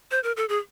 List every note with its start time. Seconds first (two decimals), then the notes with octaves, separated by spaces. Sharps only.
0.11 C5
0.24 A#4
0.37 A4
0.49 G#4